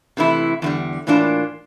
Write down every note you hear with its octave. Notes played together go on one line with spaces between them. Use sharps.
C3 E3 A3 E4
E2 D3 G3
A2 E3 A#3 D4 F4